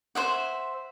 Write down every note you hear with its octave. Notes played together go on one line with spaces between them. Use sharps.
C5 E5 F#5